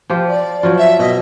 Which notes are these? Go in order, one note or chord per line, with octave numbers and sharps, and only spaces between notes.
F3 F4 G4
D5
F3 F#3 F4
E5
B2 D#5